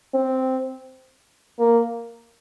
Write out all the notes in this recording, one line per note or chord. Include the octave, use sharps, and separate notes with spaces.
C4
A#3